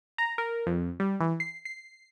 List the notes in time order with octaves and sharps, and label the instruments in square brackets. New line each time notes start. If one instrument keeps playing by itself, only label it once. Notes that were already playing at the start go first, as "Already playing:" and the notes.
[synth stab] A#5
A#4
F2
G3
E3
C7
C7